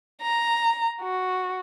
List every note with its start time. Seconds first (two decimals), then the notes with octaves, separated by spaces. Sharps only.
0.22 A#5
1.01 F#4